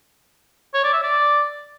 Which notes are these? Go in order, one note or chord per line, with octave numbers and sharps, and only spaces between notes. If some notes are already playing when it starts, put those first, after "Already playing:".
C#5
D5
E5
D5